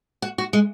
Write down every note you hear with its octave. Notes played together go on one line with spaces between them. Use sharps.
F#4
F#4
G#3